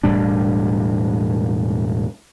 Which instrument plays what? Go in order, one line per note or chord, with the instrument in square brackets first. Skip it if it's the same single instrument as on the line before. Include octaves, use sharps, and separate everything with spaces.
[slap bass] E1 A2 G3 D4